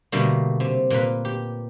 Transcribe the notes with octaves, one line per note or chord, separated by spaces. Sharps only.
B2 D3 G3 A3 A#3
C3
A#2 F4 B4
G4